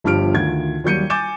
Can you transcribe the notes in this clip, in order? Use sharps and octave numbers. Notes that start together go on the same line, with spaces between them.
G1 G2 F3 G4 F6 D7
D2 D#3 F4 G#6
D#2 F#3 G3 G6 C#7 D#7
G#5 D6 G6 A6 E7